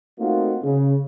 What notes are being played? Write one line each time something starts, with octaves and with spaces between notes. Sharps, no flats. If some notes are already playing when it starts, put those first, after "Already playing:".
A3 A#3 C4 D#4 F4 F#4
C#3